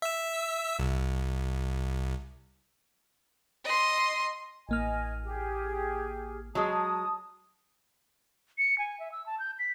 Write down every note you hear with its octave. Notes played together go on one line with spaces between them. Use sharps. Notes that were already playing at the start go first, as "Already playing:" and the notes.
E5 E6
C2
D#5 C6
A1 A#3 D#5 G#5 F6
G4 G#4
F#3 G#3 A5 D#6
C#7
G#5
E5
E6
A5
G6
B6